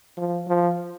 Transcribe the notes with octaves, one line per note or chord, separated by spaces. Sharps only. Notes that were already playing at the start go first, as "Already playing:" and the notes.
F3
F3